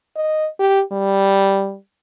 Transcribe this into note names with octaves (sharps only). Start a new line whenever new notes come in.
D#5
G4
G3